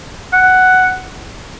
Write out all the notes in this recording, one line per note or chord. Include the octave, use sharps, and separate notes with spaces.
F#5